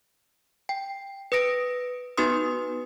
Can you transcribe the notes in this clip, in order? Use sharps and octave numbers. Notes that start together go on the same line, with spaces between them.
G5
B4 D#6 A#6 D7
B3 D#4 F#4 B4 C6 D#6